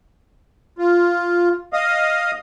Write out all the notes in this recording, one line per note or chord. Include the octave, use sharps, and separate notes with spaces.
F4
D#5 F5 D#6